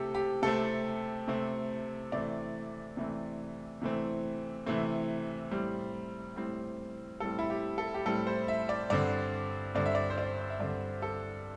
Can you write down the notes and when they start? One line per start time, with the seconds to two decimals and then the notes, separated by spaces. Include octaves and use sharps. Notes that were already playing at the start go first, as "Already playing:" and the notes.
Already playing: C3 A3 C4 G4 A4 C5
0.15 G4
0.42 C3 A3 C4 A4
1.28 C3 A3 C4
2.12 C3 E3 A3 C4 D5
2.97 C3 E3 A3 C4
3.82 C3 E3 A3 C4
4.66 C3 E3 A3 C4
5.51 A2 G3 C4
6.36 A2 G3 C4
7.20 A2 G3 C4 A4
7.39 E4
7.50 G4
7.78 A4
7.94 G4
8.06 A2 G3 C4 A4
8.27 C5
8.48 E5
8.69 D5
8.90 G2 D3 C4 D5
9.75 G2 D3 C4 D5
9.86 E5
9.95 D5
10.10 C5
10.18 D5
10.50 E5
10.60 G2 D3 C4 D5
11.02 A4